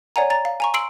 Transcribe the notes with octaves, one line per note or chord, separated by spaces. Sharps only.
C#5 D5 F#5 G#5 A#5
A#5 A6
F5
G#5 A#5 C#6
C6 E6 C7 D7 F#7